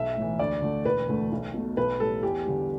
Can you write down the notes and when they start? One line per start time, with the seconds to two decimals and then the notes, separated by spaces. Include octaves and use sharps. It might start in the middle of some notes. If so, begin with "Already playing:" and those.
Already playing: B1 E5
0.17 A2 E3
0.39 D2 D5
0.62 D3 A3
0.85 E1 B4
1.09 D2 D3 A3
1.32 B1
1.54 B2 A3
1.77 B1 B4
2.00 A2 G3 A4
2.23 E2 G4
2.46 D3 G3